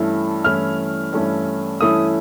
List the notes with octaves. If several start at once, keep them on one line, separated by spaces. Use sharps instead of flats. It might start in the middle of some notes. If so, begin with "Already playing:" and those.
Already playing: G2 E3 A3 C#4 E4
G2 E3 A3 C#4 E4 F6
G2 E3 A3 C#4 E4
G2 E3 A3 C#4 E4 D#6